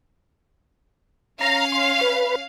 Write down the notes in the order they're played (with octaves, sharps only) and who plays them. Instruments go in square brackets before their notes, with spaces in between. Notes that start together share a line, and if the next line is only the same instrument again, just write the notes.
[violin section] C#4 F5 [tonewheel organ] A#5
[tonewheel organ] C6
B4